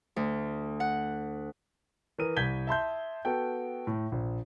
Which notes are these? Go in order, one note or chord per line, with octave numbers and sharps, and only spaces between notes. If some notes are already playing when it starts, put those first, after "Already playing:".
D2
F#5
E3 A#4 D#6 D#7
C2 G6 G#6 B6 G7
E5 A5 C6 G6
B3 F#4 A4 G5
A2
A#1